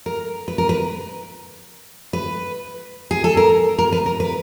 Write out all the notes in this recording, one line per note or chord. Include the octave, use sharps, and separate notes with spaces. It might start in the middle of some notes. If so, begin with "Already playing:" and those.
A#4
B4
A#4
B4
B4
G#4
A4
A#4
A#4
B4
A#4
B4